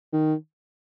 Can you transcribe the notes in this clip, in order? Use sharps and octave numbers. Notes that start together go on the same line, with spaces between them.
D#3